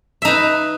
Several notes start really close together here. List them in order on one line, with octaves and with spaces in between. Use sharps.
E5 D#4 B4